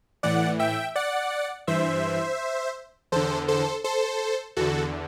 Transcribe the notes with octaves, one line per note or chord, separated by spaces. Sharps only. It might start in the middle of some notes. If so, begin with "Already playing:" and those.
A2 E3 D5 F#5
E5 G5
D5 F#5
G2 E3 C5 E5
E2 D3 A4 C5
A4 C5
A4 C5
E2 D3 F#4 A4